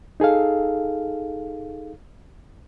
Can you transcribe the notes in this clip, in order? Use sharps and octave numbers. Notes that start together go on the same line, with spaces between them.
D#4 G#4 A4 F5